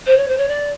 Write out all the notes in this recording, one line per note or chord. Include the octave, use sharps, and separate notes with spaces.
C5
C#5
C5
C#5
D5